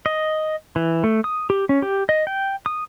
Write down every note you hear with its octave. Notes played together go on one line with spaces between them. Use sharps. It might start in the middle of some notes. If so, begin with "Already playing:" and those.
D#5
E3
A3
D#6
G4
C#4
G4
D#5
G5
D#6